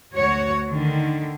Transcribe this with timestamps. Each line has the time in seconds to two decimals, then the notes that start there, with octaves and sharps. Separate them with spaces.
0.15 D2 F#4 C#5
0.69 D3 D#3